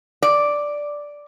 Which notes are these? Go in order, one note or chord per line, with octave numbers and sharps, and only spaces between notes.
D5